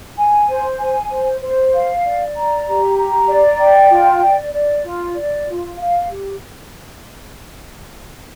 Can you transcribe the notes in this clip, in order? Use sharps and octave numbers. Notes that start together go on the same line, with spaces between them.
G#5
C5
G#5
C5
C5
F5
D5
A#5
G4
A#5
D5
G5
F4
D5
D5
F4
D5
F4
F5
G4